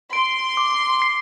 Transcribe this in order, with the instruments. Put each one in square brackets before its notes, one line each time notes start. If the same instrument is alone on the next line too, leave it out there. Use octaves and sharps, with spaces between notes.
[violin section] C6 [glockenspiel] D7
[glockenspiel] D6
C7